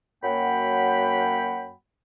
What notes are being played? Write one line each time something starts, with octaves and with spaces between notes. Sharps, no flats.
F#2 F#3 A#3 F#5 G5 B5